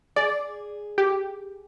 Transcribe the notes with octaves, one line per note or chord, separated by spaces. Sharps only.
G#4 D5
G4